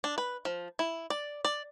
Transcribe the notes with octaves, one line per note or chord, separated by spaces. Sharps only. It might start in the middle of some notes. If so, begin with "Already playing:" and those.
D4
B4
F3
E4
D5
D5